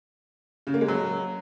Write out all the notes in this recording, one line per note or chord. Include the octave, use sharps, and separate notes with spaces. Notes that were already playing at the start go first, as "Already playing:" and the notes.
C#3
A#3
G#3
F#3